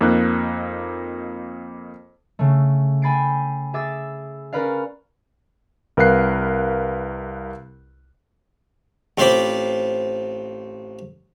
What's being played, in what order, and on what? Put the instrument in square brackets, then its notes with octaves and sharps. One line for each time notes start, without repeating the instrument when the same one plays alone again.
[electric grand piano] F2 A#3 D#4 F#6
[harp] C#3 A3
G5 G#5 B5 A6 C7 D7
G#4 E5 D6 E6 A6
C#4 A#4 B4 D5 F5
[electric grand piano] C2 A#4 B4 F5 F#6 C7
[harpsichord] A1 C4 F4 C5 B5 D6